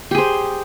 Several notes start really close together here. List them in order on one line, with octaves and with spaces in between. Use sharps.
G4 G#4 C5